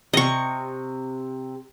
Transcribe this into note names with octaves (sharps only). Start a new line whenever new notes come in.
C3 D#5 C#6